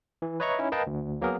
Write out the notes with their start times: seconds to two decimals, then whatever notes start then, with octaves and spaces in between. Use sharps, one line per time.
0.22 E3
0.40 B4 C#5 D#5 E5 A#5 C#6
0.59 C#4 D#4 E4
0.72 A#4 B4 D#5 F5 G5 A5
0.87 D2
1.21 F#3 A#3 B3 G#4 A#4